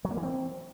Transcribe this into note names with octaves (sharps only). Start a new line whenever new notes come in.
F#3
A#3
E3
C4